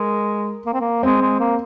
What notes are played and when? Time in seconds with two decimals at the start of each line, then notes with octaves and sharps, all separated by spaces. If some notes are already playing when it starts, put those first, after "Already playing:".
Already playing: G#3 A#4
0.66 A#3
0.73 C4
0.81 A#3
1.03 G#3 C4
1.21 G#3
1.39 A#3